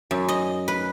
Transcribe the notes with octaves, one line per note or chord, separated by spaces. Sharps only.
F#2
D#5
B4